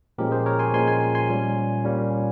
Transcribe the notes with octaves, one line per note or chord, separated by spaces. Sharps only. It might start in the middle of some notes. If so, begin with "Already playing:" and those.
A#2 F3 G#3 C#4 G4 A#4
G#4 C5
A#4 C#5
G#5 C6
A#2 F3 G#3 C#4 G#5 C6
G#5 C6
G#5 C6
A#2 G3 A#3 C#4
A#2 G3 A#3 C#4